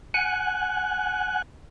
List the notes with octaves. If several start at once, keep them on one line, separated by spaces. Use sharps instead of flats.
F#5 G#5 F#6